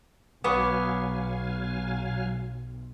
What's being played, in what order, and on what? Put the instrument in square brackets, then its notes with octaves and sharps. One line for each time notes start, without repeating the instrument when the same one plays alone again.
[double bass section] B1 [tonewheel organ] F#3 F5 G#5 [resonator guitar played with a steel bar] B3 [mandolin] C#5 D6 D#6